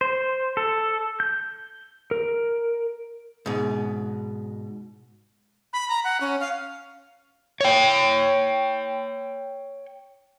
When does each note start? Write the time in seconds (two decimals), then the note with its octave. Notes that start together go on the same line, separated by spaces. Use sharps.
0.01 C5
0.57 A4
1.20 G6
2.11 A#4
3.46 G#2 B2
5.73 B5
5.89 A#5
6.04 F#5
6.21 C#4
6.41 F5
7.61 C#5 G5